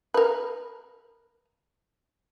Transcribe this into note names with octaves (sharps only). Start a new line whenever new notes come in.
A#4 B4